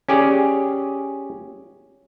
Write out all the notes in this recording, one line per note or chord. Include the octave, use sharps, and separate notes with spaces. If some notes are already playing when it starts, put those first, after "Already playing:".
C#4 G4 G#4 D5